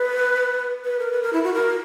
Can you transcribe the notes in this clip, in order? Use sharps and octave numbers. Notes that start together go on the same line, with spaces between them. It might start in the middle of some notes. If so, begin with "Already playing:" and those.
Already playing: B4
B4
A#4
B4
A#4
E4
F#4
A#4